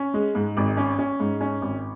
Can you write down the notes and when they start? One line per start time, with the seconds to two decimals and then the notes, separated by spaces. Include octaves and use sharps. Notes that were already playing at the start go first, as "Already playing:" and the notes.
Already playing: C#4
0.14 G#3
0.35 G#2
0.57 G#1
0.77 C#4
0.99 C#4
1.20 G#2
1.41 C#4
1.62 G#1